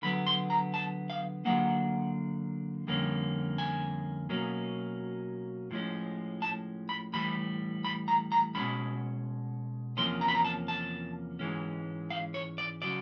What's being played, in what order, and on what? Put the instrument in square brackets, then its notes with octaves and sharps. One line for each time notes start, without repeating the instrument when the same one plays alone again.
[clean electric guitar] D3 F#3 B3 B5
C6
A#5
A5
F5
D3 F#3 A#3 F#5
F2 D3 G3 A#3 C#4
G#5
B2 F#3 A#3 C#4
A2 F3 G#3 C#4
A5
B5
A2 E3 G3 B5
B5
A#5
A#5
B2 G#3 C#4 B5
E2 C3 F3 A#3 C#4 C6
A#5
B5
A#5
A5
A5
G#2 E3 G#3 C#4
F5
C#5
D5
C#3 F#3 D5